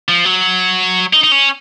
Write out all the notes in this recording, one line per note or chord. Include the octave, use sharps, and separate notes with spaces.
F3
F#3
D#4
D#4
C#4